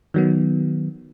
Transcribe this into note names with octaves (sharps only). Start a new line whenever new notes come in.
D#3 F#3 B3